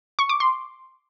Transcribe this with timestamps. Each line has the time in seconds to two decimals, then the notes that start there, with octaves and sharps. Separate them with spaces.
0.19 C#6
0.29 D6
0.40 C6